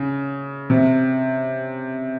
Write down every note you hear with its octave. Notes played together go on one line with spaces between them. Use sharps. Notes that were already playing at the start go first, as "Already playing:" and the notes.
Already playing: C#3
C3